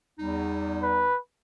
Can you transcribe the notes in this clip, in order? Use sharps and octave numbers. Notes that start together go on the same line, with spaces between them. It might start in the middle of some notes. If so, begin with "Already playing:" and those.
E2 G3 D#4
B4